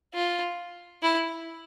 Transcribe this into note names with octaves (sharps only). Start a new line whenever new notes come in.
F4
E4